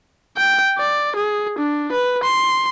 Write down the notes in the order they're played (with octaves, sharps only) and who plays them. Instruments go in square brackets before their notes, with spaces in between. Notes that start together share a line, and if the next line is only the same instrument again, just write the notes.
[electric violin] G5
D5
G#4
D4
B4
C6